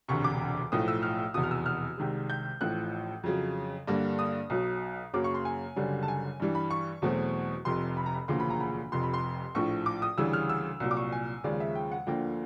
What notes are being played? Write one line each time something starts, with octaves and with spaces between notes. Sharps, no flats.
E1 D2 C3 C#6
D6
B1 A2 F3 A3 D#6
E6
F6
F1 E2 B2 D#6
F6
E6
F6
C2 C3 D#3 G#3
G6
A1 A2 F3 F#6
F2 C#3 F#3
G2 D3 G3 A#3
D#6
B1 B2 F#3
F#2 C#3 F#3 A#3 D6
C#6
C6
G#5
F#1 F#2 D3 G3
A5
G#5
G2 E3 G3
B5
C#6
E2 B2 F#3 A3 C4
F1 F2 C3 C6
B5
A#5
B5
E1 D2 C#3 F3 A#3 C6
B5
A#5
B5
F1 F2 C3 C6
B5
C6
A#1 A2 F3 C#6
D6
D#6
D2 C#3 E3 G3 E6
F6
E6
C2 A#2 F#3
D6
C#6
G#5
D#2 C#3 F3 G#3 D5
E5
G5
F#5
D2 D3 F3 A#3 G5